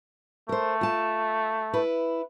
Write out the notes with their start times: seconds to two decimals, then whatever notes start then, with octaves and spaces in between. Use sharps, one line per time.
0.49 A3 A#4 C5
0.81 F4 A5
1.73 E4 B4